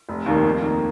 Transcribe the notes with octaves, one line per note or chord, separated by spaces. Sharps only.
F1
D#2 D#3 A#3
F2
D#3 A#3